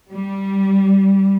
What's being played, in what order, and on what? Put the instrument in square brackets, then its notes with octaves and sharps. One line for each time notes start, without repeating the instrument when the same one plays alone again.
[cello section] G3